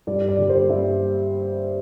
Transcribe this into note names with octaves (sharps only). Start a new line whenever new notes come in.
G2 D5
D5
D3 G3
C5
G2 E5